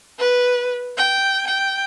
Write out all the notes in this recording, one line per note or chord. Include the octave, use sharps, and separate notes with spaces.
B4
G5
G5